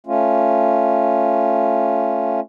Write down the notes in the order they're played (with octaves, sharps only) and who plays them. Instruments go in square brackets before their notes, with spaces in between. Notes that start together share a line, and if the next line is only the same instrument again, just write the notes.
[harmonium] A3 C#4 F4